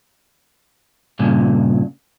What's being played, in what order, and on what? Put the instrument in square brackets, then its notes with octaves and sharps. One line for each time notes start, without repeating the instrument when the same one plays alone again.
[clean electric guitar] G2 A#2 C#3